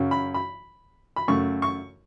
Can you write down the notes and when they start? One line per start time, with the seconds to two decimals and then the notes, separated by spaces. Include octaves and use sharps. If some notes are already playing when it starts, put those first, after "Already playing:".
Already playing: F#2 C#3 F#3
0.11 B5
0.34 B5
1.16 B5
1.28 F#2 C#3 A3 C#6
1.62 C#6